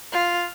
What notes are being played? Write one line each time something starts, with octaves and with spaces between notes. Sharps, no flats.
F4